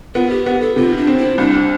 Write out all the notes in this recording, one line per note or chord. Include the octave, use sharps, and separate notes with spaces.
B3 F4
G4
B3 G4
A4
C3 F4
D4
C4
E4
C2 D4